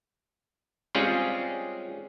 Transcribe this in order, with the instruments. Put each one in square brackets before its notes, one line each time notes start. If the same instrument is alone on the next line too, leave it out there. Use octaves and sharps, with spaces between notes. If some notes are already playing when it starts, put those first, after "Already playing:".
[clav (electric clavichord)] G3 G#3 C4 C#4 F4 G#4